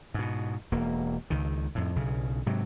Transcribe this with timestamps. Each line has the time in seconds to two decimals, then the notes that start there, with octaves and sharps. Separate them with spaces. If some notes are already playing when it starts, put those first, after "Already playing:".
0.14 G#2 B2
0.72 E1 A#3
1.30 C#2 D#3
1.75 F2 A2
1.96 B1 C#3
2.46 G#2 C3 F#3